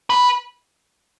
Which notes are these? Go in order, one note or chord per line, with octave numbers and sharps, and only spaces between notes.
B4